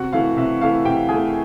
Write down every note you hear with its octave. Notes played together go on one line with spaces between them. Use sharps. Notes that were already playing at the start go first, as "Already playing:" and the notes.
Already playing: C3 F#4 F#5
E3 A3 F5
C3 E5
E3 A3 F5
C3 G4 G5
E3 A3 G#4 G#5